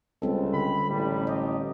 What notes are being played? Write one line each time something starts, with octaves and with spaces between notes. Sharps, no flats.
C#2 G3 C4 A4
D3 B5
A1 G3
G4 D#5